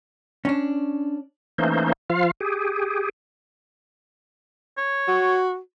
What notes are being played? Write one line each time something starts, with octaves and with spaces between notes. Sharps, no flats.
C#4 D4
E3 A3 A#3 C#4 D#4 C5
F3 F4 F5
G4 G#4
C#5
F#4